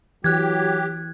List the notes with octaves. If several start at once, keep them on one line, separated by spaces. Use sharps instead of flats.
E3 F#3 G4 F#6 G#6